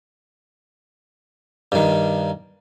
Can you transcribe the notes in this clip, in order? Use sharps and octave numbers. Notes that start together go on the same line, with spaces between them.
G2 D#3